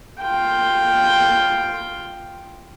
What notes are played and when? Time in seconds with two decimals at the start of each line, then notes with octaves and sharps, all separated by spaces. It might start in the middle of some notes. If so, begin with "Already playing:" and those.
0.22 F4 G5